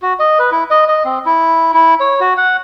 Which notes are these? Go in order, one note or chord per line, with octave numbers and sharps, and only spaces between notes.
F#4
D#5
B4
E4
D#5
D#5
C4
E4
E4
C#5
F#4
F#5